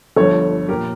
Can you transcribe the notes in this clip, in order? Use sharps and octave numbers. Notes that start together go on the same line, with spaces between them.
G1 G2 F3 A4 C#5
A#2 F3 G4 A#4